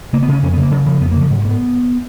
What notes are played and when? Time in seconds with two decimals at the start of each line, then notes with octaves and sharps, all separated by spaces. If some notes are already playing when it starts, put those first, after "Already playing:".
0.13 C#3 A#3
0.23 B3
0.28 C#3 C#4
0.43 F2 C#4
0.53 B3
0.57 C#3 A#3
0.71 C#3 F#3
0.86 C#3 F3
1.01 F2 B3
1.11 A#3
1.16 C#3
1.21 F3
1.30 G#2 F#3
1.41 G#3
1.45 G#2 A#3 B3